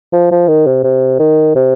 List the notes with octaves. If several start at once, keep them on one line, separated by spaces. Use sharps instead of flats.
F3
F3
D#3
C3
C3
D#3
C3